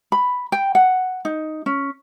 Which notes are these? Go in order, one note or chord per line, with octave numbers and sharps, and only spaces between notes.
B5
G5
F#5
D#4
C#4